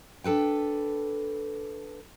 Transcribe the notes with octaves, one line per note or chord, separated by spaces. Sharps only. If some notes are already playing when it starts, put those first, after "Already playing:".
D4 A4 B4 G5